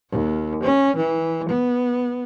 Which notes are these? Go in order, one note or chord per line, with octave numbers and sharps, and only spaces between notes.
D#2
C#4
E3
B3